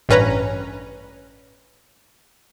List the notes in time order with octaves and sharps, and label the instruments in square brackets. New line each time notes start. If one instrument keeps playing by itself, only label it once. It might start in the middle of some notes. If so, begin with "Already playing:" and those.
[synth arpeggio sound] A1 G2 C#4 B4 A#5